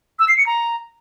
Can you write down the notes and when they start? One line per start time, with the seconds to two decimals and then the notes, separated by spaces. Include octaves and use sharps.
0.19 E6
0.28 C7
0.37 C#7
0.47 A#5